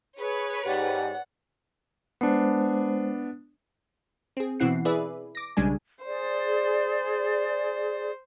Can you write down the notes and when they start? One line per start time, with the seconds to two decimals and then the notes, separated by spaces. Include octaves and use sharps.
0.18 G#4 B4 C#5
0.66 G#2 G4 D5 F#5
2.21 G#3 B3 D4 C5
4.37 C4 G#4
4.60 B2 E3 C4 E4 F#5 C7
4.85 E4 G#4 B4 D5 E5
5.35 D6 A#6
5.57 B1 C#3 G3 G#3 D4 G#5
6.04 G#4 C5 D5